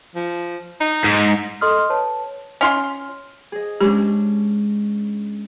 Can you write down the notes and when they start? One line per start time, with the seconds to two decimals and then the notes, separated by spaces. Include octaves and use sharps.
0.15 F3
0.80 D#4
1.04 G#2
1.61 A4 D#5 C6 D#6 F6
1.90 B4 C#5 A5
2.61 C#4 F4 C6
3.52 G#4 D#5
3.81 G#3 C#4 D4 G4